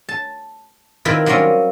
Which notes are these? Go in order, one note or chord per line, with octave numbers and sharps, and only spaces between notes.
A5
D#3 C4 E4 F4 A#4 B4
F#3 G3 A#3 C4 C#4 F4